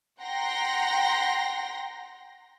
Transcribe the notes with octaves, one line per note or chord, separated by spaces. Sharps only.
F#5 G5 A#5 C6 A#6